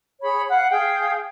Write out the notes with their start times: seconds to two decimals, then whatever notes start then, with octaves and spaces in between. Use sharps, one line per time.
0.21 G#4 C#5 B5
0.50 F5 F#5
0.70 G#4 F5 G5